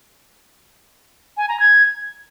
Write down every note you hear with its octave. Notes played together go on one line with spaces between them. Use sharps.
G#5
A#5
G#6